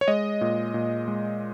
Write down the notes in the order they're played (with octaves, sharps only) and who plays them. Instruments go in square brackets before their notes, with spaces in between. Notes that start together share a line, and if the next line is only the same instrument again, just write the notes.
[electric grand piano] C#5
G#3 D#5
A#2
A#2
G#3